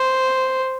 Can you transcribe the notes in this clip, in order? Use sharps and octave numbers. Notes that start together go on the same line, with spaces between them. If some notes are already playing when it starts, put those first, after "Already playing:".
Already playing: C5